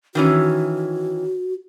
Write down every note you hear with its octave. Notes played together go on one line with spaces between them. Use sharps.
D#3 E3 C#4 F#4